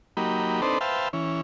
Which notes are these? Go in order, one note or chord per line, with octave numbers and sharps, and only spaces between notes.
F#3 A#3 D#4 G4 B5
C4 D4 D#4 A4 B4 C5
B4 C5 E5 F5 G5 A5
E3 C#4